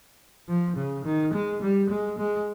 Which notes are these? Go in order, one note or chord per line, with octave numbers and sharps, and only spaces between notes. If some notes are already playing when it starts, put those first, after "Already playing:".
F3
C#3
D#3
G#3
G3
G#3
G#3